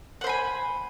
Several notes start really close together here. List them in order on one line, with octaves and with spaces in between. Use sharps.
F#5 C5 B5 G#5